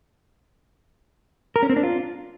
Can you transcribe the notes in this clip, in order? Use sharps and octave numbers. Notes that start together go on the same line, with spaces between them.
A#4
C#4
C4
D4
F4